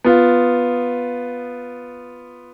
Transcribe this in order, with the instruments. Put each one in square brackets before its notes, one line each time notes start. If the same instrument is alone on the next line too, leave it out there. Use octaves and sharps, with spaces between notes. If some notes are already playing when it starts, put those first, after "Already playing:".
[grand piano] B3 F4